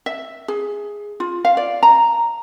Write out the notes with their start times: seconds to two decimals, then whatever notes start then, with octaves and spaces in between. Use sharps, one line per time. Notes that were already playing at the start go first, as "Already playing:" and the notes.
0.06 E5
0.48 G#4
1.20 F4
1.45 F5
1.57 D5
1.83 A#5